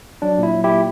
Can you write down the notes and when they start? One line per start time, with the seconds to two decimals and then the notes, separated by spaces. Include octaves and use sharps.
0.22 F#3 D4
0.38 A#2 E4
0.54 F#3
0.64 A#2 E4 G4